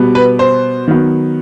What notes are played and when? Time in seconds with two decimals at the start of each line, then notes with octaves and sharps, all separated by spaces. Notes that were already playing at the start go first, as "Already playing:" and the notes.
Already playing: B2 G3 B3
0.15 B4
0.39 C5
0.88 D#3 F#3 B3